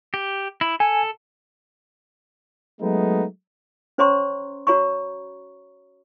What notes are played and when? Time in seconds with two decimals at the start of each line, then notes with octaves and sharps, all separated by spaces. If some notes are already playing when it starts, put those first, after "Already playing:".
0.14 G4
0.61 E4
0.80 A4 G#5
2.82 F#3 G#3 A3 B3 D#4
3.98 C#4 C5 C#5 A#5 C6 C#6
4.67 F#4 C#5 A#5 B5 C#6